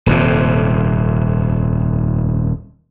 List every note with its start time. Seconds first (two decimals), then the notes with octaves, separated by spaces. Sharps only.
0.06 D#1 F2 C3